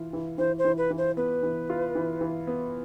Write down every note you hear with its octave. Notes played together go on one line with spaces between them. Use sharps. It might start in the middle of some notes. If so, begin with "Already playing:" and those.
Already playing: E3 F4
E3
E3 C5
C5
E3
B4
E3
C5
B3 B4
E3
F4
E3
E3
B3